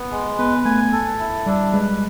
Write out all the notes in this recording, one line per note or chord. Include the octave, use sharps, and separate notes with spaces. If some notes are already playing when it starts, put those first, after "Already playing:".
Already playing: B3
G#3
B3 B4
A3 G#5
A4
E4
G3 D4
G#3 B4